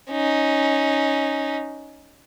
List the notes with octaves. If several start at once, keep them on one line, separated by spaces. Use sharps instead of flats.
C#4 D#4